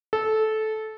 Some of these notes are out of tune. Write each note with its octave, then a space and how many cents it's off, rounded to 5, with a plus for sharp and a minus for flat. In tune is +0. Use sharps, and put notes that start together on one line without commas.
A4 -15